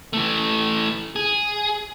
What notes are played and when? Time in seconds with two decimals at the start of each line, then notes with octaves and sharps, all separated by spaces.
0.13 E3 A3
1.16 G#4